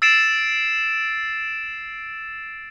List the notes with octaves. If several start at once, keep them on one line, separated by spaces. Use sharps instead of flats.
E6 A6 C7 D7 E7